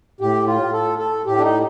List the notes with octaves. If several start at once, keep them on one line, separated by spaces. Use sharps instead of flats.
A2 G4
F4
A4
A4
A2 G4
D4
D#4